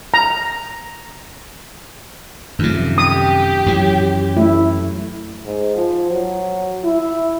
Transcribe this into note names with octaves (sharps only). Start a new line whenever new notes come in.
A#5
F#2 C3 D#3 F3 A3
G4 D#6
F#2 E3 F#3
A3 E4
G#2
F3
F#3
E4